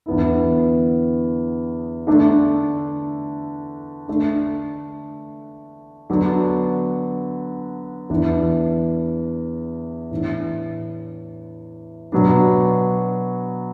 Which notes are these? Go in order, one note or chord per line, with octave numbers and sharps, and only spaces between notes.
E2 D3 B3 E4
D3 A3 D4
D3 A3 D4
D3 F#3 B3 D4
E2 E3 D4
A2 E3 D4
B2 F#3 B3 D4